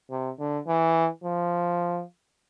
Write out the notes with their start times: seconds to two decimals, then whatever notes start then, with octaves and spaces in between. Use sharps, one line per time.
0.10 C3
0.39 D3
0.67 E3
1.23 F3